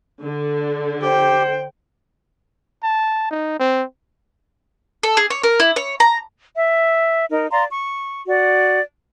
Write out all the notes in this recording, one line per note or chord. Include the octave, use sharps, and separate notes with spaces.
D3
G4 C5 G5
A5
D#4
C4
A4
G#4
C#5
A#4
E4
C#5
A#5
E5
D#4 A#4
D5 F5 A#5 C6
C#6
F#4 D5